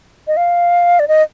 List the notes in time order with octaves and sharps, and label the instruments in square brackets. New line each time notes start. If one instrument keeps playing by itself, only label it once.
[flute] D#5
F5
D5
D#5